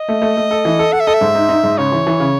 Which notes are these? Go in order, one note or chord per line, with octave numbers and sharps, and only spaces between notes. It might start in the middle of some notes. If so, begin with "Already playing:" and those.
Already playing: D#5
A3
A3
A3
A4
E3
A4
A4 F#5
E5
A4 D#5
E5
G#2
D#4
D#4
G#2
C#3 C#5
E3
E3
C#3